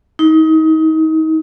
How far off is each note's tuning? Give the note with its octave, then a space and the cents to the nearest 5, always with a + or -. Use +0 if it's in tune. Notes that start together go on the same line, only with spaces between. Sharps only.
D#4 +30